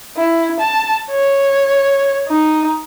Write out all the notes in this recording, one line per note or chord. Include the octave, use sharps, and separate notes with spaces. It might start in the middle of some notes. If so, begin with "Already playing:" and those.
E4
A5
C#5
D#4